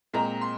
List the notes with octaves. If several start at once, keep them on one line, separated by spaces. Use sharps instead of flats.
A#2 G#3 C4 A#5
C6